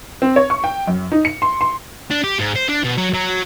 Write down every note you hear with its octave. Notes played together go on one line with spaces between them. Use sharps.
C4
C#5
C#6
G5
F#2
D#4
C#7
C6
C6
D4
G4
G#2
C5
D4
B2
F#3
F#3